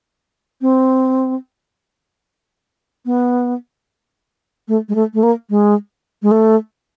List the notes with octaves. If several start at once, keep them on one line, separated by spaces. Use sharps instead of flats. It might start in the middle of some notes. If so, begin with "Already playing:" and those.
C4
B3
A3
G#3
A3
A3
A#3
G#3
G#3
A3